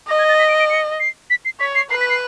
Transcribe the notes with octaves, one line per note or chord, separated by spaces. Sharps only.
D#5 A#6
G#6
A6
B6
D7
D7
C#7
C7
B6
C7
C#5 B6
C7
B4 C7
B6
C7